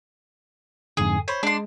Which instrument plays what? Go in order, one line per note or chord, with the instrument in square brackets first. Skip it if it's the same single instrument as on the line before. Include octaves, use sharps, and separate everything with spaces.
[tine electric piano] F2 G#2 D3 [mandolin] G#4
[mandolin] C5 [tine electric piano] C#5 B5
[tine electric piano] G#3 [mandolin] D4 C6